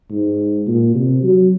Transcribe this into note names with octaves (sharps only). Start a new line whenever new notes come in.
G#2
A#2
C3
F#3